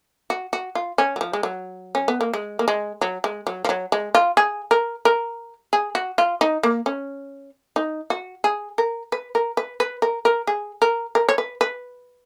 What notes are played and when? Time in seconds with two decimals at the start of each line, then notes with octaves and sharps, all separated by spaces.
0.30 F#4
0.53 F#4
0.75 F4
0.98 C#4
1.16 F#3
1.21 F3
1.33 G#3
1.43 F#3
1.95 C#4
2.08 B3
2.21 A#3
2.34 G#3
2.59 A#3
2.68 G#3
3.01 F#3
3.24 G#3
3.47 F#3
3.65 F3
3.69 F#3
3.92 G#3
4.15 F4
4.37 G#4
4.71 A#4
5.05 A#4
5.73 G#4
5.95 F#4
6.18 F4
6.41 D#4
6.63 A#3
6.86 C#4
7.76 D#4
8.10 F#4
8.44 G#4
8.78 A#4
9.12 B4
9.35 A#4
9.57 B4
9.80 B4
10.02 A#4
10.25 A#4
10.47 G#4
10.82 A#4
11.15 A#4
11.29 C#5
11.38 B4
11.61 B4